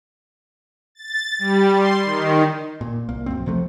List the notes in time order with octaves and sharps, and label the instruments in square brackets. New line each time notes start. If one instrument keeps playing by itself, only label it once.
[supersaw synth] A6
G3
C6
D#3
[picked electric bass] A#2
C2 A#3
A#1 F#2 C4
C#2 C3 F3 A3